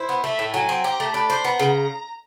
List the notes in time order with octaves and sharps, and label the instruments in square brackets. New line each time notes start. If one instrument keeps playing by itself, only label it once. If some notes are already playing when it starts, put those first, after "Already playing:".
Already playing: [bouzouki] E4 [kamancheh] C5
[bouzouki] B3
[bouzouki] A3 [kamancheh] E5
[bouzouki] A2
[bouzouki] F#3 [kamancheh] G#5
[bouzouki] C4
[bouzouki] G4 [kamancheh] A#5
[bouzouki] A3
[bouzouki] D4 [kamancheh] B5
[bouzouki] C5
[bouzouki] B3 [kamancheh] A#5
[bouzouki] C#3